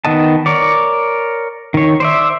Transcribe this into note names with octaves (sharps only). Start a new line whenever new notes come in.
D#3 B3 D#5 A5
A#4 C#5 D5
D#3 C#5
C5 D5 E5